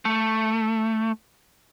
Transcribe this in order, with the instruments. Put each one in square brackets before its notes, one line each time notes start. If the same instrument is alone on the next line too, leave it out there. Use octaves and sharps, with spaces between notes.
[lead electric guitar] A3